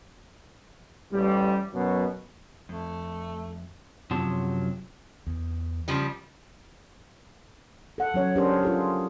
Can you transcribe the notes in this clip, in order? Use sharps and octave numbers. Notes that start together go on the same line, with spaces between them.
A1 G3
F#2 B2 F#3
F2 A3
F#2 C3 F3 F#3 A5
E2
C#3 F3 G3
A4 F#5
F#3 C#4 C#5
C#4 D4 G4 G#4 A#4 C5
F4 G#4 A4